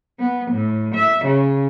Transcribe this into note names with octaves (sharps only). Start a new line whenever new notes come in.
B3
A2
E5
C#3